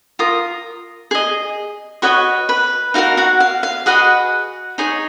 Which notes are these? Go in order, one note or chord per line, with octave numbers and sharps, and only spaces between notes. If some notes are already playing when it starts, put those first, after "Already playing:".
F4 A#4 D#6
G#4 D#5
F#4 B4 C#5 D#5 C#6
B4 B5
D#4 F#4 A#4 F5
F#4 F#5
F5
F5
F#4 G#4 B4 D#5 F#5
D#4 G#4 C#5